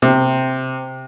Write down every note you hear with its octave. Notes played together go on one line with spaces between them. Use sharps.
C3